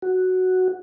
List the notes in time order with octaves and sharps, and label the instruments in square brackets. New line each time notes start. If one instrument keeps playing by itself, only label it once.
[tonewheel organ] F#4